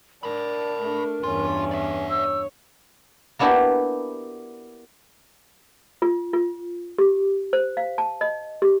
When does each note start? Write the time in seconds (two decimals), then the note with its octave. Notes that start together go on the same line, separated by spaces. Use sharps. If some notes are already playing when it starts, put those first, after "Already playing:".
0.23 D4 A#4 A5 B5
0.81 A3 D4
1.23 E2 G2 E3 C#4 F4
1.71 D5 E5
2.10 C#5 E6
3.39 A#3 B3 D4 E4 F#4 G4
6.02 F4
6.33 F4
6.98 G4
7.53 C5
7.77 F5
7.98 A5
8.21 D#5
8.62 G4